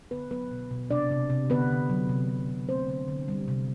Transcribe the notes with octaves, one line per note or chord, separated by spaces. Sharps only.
D3 B3 B4
F#3 B3 B4
B2
B2
C3 D4 D5
C3
C3
D3 B3 B4
D3
F#3
C3
C3
C3
A3 C4 C5
D3
D3
G3
C3